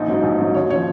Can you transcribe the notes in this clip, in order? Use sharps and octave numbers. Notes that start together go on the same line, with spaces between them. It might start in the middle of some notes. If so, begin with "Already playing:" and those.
Already playing: A#1 D#4
G#2 F#3
A#1
G#2 F#3
D#2 C#5
C#3 F3 C#5